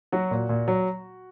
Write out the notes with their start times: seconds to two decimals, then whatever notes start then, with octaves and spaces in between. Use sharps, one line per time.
0.12 F#3 F#4
0.31 A#2
0.49 A#2
0.68 F#3